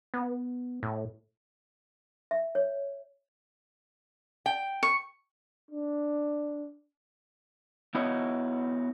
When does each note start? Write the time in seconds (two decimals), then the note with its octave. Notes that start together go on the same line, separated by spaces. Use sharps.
0.14 B3
0.83 A2
2.31 E5
2.55 C#5
4.46 G5
4.83 C#6
5.71 D4
7.95 B3 E4 F#4 B4 C#5 D#5